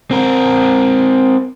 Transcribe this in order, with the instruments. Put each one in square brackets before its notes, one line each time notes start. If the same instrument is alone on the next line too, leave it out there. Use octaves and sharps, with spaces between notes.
[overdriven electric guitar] C4 A#4